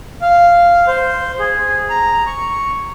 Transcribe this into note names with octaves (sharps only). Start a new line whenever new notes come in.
F5
C5
G#4
A#5
C#6